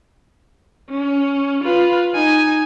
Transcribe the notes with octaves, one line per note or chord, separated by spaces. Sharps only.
C#4
F4 B4
D#4 G#5